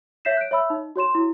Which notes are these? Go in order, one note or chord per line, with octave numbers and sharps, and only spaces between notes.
C#5 E5 G6 B6 C7 E7
F#6 D7
C#5 E5 B5 E6
D#4
F#4 C#5 C6 E7
E4